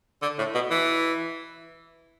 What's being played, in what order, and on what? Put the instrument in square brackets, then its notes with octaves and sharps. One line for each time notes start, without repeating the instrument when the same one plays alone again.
[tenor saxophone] D3
A2
B2
E3